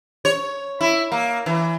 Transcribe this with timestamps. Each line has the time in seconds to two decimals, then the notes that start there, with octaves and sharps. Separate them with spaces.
0.25 C#5
0.81 E4
1.12 A#3
1.46 E3